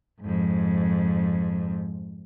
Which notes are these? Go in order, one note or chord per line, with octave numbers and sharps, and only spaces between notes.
F2 G#2